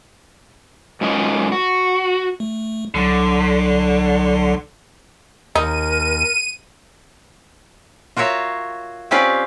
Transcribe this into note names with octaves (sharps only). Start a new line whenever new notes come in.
G#2 F#3 C#4 F4 A#4 D#5
F#4
A3
C2 D3 F#3
D#2 D#4 A#4 D#7
F4 F#4 A#4 C#5 E5
C4 C#4 F4 G4 B4 D5